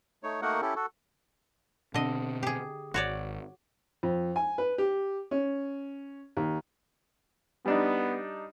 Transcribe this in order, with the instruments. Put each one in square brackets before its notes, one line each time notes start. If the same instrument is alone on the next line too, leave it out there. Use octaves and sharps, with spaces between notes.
[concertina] A3 D#4 C#5
A3 A#3 D#4 F#4 A#4 F#5
C#4 E4 G4 A4
F#4 A4
[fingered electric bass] B2 C4 [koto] D3 D#5
[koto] G4 G#4
[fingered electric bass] G#1 [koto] F#4 C#5 D5
[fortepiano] F2
G#5
B4
G4
C#4
D#2
[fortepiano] G3 D4 D#4 [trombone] B3